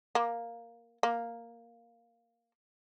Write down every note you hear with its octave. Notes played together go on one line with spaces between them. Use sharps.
A#3
A#3